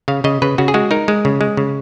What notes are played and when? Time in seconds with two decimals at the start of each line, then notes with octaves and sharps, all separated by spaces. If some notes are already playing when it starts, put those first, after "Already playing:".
0.08 C#3 F5
0.24 C#3 D#5
0.42 C#3 B4
0.58 C#3 F#4
0.68 G#4
0.74 G#3 F#4
0.91 D#4 A#4
1.08 G#3
1.25 C#3
1.41 G#3
1.57 C#3